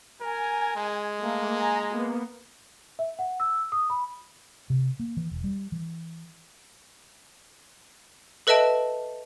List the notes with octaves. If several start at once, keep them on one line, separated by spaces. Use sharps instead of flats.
A#4 G#5
G#3
A3 A#3
G#5 A#5
A#3 B3
E5
F#5
E6
D#6
B5
C3
A#3
E3
E1
G3
E3
A4 B4 D#5 E5 A5 D7